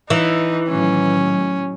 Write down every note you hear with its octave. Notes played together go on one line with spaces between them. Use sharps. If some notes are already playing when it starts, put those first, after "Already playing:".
E3 D#4
A2 D#3 F#3 C#4